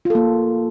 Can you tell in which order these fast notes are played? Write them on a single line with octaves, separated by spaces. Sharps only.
F4 A4 A#3